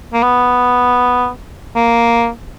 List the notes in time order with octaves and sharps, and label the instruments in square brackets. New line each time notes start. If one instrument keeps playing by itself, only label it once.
[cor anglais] A#3
B3
A#3